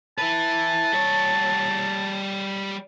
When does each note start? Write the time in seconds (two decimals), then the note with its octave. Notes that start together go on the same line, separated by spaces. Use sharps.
0.18 E4 B4 A5
0.93 G3 C#5